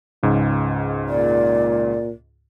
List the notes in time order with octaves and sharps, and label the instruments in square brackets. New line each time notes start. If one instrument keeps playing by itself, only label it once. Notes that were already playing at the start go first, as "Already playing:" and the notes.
[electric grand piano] C#2 G#2 C#3
[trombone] A#2 [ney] D5